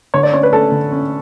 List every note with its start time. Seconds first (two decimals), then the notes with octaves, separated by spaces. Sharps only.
0.14 D3 C#5
0.23 D5
0.33 C#4 C#5
0.43 B4
0.53 C#4 A4
0.72 D3
0.92 C#4